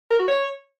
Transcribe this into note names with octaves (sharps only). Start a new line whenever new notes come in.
A#4
F#4
C#5